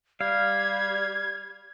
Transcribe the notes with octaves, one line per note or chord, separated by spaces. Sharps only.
G3 F5 G#6